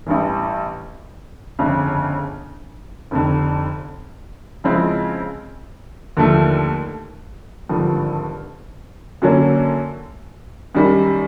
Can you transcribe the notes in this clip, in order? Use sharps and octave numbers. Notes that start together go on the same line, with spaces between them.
A1 G2 E3
G1 F2 C#3
F1 F2 D3
C#3 F3 G#3 C4 E4
D#2 D3 F3 A3
G#1 G2 D3 F3
F#2 D3 F#3 A#3 C#4
F#2 D#3 G3